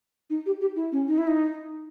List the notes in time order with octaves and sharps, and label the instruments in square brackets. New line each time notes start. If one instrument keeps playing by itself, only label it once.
[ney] D#4
G4
G4
E4
C#4
D#4
E4
D#4